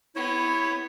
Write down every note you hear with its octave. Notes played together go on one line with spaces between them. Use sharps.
B3 E4 C#5